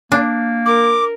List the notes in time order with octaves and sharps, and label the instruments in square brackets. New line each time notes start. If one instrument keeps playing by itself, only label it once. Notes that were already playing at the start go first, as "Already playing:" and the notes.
[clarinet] A#3 [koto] D4
[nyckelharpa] A#4 [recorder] D6